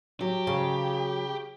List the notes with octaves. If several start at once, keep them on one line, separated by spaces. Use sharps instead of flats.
F#3 G4
C#3